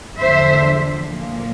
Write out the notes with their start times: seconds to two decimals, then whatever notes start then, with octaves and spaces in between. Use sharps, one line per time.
0.18 E2 D3 F3 C5 E5
1.04 A#2 F3 A#3